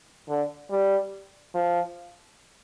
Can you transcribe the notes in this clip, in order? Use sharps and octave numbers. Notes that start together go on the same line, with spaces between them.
D3
G3
F3